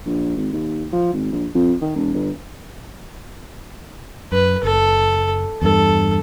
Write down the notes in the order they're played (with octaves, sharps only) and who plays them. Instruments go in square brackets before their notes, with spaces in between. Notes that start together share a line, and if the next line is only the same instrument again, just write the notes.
[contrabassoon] A#1
G#1
D#2
F3
G#1
A#1
F2
D#3
E1
G1
[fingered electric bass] F#2 [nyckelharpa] B4
[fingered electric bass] F#1 [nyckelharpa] A4
[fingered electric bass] E2 G2 [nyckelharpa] A4